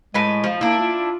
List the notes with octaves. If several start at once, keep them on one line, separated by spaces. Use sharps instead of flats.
A2 G#3 B4 G#5
F3
A#3 D4 E4
F4